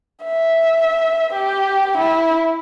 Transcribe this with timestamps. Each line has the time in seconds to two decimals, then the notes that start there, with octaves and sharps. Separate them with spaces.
0.24 E5
1.33 G4
1.97 E4